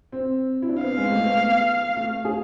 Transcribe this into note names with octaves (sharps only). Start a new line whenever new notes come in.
C4
E4
D4
C4
B3 F5
G#3
A3
B3
A3
G#4